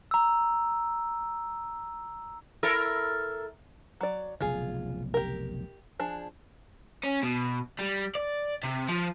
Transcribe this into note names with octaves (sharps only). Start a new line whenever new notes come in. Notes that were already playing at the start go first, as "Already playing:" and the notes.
A#5 E6
E4 A4 A#4
F#3 D5
F1 B1 C#3 F4 G#4
G4 A#4
F3 D4 G#4
C#4
B2
G3
D5
C3
F3